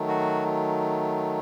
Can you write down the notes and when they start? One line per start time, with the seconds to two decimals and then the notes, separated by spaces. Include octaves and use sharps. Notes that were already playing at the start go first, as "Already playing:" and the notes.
Already playing: D#3 F#3 A3
0.08 F#4